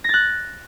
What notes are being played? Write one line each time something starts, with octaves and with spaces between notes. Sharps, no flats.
F#6 A6 A#6